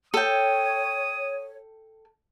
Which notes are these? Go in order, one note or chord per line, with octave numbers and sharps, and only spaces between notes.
A4 C#5 G5 D#6